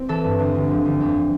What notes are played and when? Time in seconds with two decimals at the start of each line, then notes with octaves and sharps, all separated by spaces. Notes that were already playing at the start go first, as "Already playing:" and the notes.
Already playing: C4
0.09 E3 A4
0.24 G2
0.39 D2
0.55 D2
0.70 F3
0.85 D2
1.00 F2